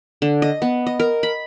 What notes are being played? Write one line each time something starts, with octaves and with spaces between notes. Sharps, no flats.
D3
D#5
B3
D#5
A#4
B5